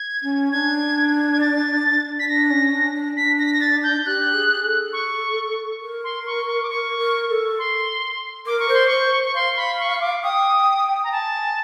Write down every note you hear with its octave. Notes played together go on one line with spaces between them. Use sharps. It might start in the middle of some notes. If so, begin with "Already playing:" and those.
Already playing: G#6
C#4
D4 G#6
G#6
A6
B6
D4 A#6
C#4
D4
D4
D4 B6
A#6
B6
A#6
A6
G6
G4 F#6
G#4
A4
C#6
A#4
C6
C#6
C#6
D6
A#4 C#6
A#4
A4
C6
A#4 D6
C#6
C5 C6
C5 C#6
C#6
F5 C6
B5
C#6
D6
G5 D#6
A#5
G#5 A5